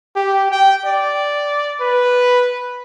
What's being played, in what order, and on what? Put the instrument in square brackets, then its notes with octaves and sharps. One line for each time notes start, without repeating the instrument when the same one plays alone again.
[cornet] G4
G5
D5
B4